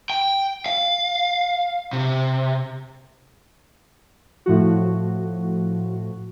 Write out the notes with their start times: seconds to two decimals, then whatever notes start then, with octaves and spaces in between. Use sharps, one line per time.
0.10 G5
0.66 F5
1.93 C3
4.46 A2 F3 F#4